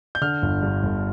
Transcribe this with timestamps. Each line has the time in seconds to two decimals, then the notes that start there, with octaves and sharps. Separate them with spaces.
0.15 G6
0.21 D3 F6
0.42 G1
0.63 G2
0.83 G1